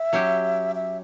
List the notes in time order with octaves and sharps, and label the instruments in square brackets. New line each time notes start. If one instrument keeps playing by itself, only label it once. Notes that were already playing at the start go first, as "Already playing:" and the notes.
Already playing: [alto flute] E5
[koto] F#3 C#4 G4
[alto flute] E5